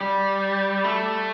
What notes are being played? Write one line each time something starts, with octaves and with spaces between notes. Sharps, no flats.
G3
A3